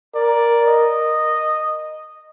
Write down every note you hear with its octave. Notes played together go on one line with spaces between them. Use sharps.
A#4 D5
D#5